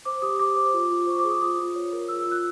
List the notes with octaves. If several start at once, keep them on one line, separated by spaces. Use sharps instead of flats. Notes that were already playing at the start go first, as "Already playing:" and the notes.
C5 D6
G4 D#6
G4 D6
C5
F4
F4
C5 C#6
D6
G#4
D#6
F4 D#6
F4
C#5
A#4
F4 E6
E6
F4
F#6